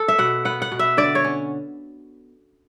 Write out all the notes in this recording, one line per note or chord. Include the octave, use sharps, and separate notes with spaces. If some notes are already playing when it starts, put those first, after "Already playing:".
Already playing: A4
E5
B2 F#5
B3 F#5
F#5
B2
E5
D3 D5
C#5
C#4